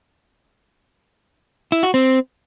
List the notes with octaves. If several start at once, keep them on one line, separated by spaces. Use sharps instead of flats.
E4
F#4
C4